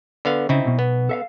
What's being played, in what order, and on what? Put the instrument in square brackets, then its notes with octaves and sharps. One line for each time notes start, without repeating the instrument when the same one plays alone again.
[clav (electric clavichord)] D3 B3 F5
[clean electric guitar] C#3 [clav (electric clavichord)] C4 D#4 E4
[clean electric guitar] B1 B2
[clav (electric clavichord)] B3
[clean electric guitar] A4 E5 F5